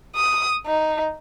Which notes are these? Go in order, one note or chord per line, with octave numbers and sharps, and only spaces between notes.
D#6
D#4